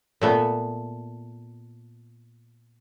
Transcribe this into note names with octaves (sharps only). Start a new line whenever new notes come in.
A#2 A3 B3